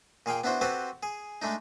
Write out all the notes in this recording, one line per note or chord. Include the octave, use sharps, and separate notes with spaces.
A#2 G#4 F5 G5
B3 D4 E4 F#4 C5
C4 F#4 G4 A4 B4 C5
G#4
G#3 A3 D4 D#4